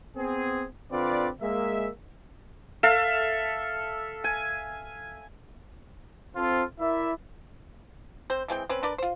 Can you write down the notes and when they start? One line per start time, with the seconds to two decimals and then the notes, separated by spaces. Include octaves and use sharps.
0.16 B3 C4 G#4
0.91 D3 C4 F4 B4 D5
1.41 G#3 A#3 E5
2.83 A4 E5 F5
4.24 G#5
6.36 C4 F4 A4
6.80 E4 A#4 D5 E5
8.30 C4 C5
8.48 E3 G#3 C4 G5
8.69 C4 C#4 B4
8.83 D4 A#4 B4 D5
8.98 F4 C5